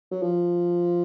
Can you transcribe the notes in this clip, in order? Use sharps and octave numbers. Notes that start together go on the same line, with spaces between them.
F#3
F3